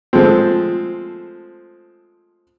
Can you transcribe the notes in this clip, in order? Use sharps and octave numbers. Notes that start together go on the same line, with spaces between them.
F3 G#3 A3 C4